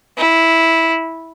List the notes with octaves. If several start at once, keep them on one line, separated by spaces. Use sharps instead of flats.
E4